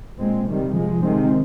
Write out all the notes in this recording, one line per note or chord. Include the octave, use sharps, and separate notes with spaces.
A#2 G#3 C4
C3 D#3 G3
C3 F3 G#3
C3 D#3 G#3 C4